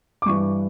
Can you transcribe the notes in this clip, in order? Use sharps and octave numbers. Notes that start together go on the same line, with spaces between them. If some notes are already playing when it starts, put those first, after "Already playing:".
D6
G2 E3 C#6